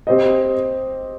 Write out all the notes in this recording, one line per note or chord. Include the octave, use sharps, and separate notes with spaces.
C4 G4 C5 D#5